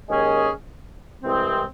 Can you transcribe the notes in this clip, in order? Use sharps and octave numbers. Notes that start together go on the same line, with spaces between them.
D#2 D#3 G#3 C#4 G#4
C2 C3 E3 G#3 C4